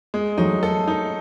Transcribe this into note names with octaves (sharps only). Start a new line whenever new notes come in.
G#3
F#3 A3 D#4
A4
D#4